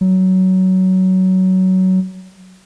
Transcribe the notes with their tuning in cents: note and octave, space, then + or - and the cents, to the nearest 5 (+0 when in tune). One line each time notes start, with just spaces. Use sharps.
F#3 +15